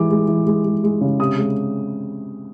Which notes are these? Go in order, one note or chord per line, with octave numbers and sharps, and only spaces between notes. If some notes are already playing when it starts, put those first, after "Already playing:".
Already playing: E3 G#3 D6
G#3
E3
G#3
G#3
G#3
C#3
C3 D#6
G#3